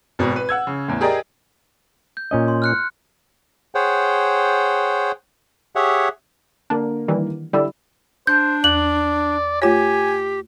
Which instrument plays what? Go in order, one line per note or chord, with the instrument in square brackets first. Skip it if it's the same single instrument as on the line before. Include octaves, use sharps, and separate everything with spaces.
[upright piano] G#1 B2
B4
F#5 E6 G#6
C#3
E2 A2
G4 G#4 A#4 D5 D#5
[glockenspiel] G6
[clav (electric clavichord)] A#2 C#4 D#5
[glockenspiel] C6
F6 F#6 C#7
[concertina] G#4 C5 C#5 F#5 G5
G4 G#4 C#5 E5 F#5
[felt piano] D3 A#3 A#4 [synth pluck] D4
[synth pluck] D#3 E3 G3
[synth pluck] D3 G3 [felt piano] E4 D5 E6
[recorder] D4 [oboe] C5 [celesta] G6
[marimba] E2 F#6 [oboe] D5 [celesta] F#7
[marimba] A3 F4 C#5 [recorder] G4 [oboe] G#5